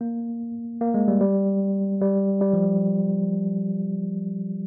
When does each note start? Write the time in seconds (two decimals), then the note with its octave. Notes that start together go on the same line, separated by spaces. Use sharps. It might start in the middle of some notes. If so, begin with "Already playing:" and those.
0.01 A#3
0.81 A#3
0.94 G#3
1.08 G3
1.21 G3
2.01 G3
2.41 G3
2.53 F3